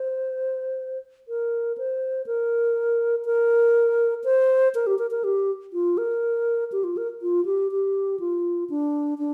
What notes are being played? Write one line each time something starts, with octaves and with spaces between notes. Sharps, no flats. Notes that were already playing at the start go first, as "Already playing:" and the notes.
Already playing: C5
A#4
C5
A#4
A#4
C5
A#4
G4
A#4
A#4
G4
F4
A#4
G4
F4
A#4
F4
G4
G4
F4
D4
D4